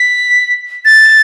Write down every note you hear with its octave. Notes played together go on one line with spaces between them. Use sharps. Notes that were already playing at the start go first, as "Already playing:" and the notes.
Already playing: B6
A6